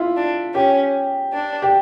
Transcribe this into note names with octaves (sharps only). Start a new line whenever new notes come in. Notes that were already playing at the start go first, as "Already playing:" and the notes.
Already playing: E4 F4
D4
C#4 G4
D4
G4